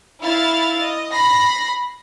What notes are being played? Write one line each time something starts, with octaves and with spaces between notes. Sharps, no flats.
E4 F5 F6 A6
D#5
B5 A#6 C7